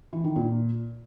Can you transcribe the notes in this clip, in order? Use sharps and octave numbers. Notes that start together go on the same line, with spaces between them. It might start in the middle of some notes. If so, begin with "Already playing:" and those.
E3
D#3
A#2